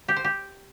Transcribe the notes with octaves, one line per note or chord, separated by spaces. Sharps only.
G4
C5
G4